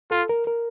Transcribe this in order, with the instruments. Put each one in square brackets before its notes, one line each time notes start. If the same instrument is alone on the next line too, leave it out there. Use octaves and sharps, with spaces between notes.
[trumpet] F4 [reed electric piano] A4
[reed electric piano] A#4
A#4